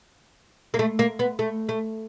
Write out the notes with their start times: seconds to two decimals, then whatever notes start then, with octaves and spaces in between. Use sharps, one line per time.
0.74 A#3
0.79 A3
0.99 A#3
1.19 B3
1.39 A3
1.69 A3